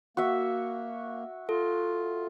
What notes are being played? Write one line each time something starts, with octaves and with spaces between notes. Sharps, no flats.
A#3 F#4 E5
F4 A4